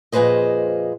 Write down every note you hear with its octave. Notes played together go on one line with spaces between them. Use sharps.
F2 A#2 G#4 B4 C5 D#5